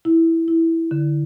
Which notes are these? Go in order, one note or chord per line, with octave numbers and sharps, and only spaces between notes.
E4
E4
D3